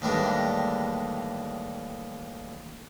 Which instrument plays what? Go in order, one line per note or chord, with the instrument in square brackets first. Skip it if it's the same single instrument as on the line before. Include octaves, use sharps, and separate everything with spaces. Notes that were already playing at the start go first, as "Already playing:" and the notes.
[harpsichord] D#2 A2 E3 G3 G#3 D4